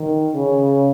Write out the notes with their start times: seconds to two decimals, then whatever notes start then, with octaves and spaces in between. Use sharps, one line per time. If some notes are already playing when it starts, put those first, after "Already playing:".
Already playing: D#3
0.33 C#3